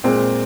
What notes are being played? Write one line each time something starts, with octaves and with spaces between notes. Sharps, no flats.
A#2 G#3 C4